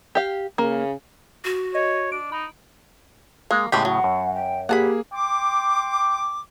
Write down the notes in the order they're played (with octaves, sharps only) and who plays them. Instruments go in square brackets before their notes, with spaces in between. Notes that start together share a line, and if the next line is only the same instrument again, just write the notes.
[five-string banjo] G4 F5
[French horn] C#3 [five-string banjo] A#3
[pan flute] F#4
[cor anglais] C#5 [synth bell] D#5
[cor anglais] D4 [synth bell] D7
[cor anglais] D#4 [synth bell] B5
[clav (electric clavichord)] G#3 [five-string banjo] A#3
[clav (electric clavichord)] A2 C#3 [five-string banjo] G#3 B3 G4 [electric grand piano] C7
[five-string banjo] F#3 [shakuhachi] F#5
[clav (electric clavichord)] F#2
[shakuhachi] G5
[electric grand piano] A#3 G#4 [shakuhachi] G4 [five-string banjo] F#5 A5 B5
[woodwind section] G5 C6 D6